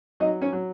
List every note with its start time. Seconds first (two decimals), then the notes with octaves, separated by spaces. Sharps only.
0.20 F#3 D#4 D#5
0.41 C#4 C#5
0.53 F#3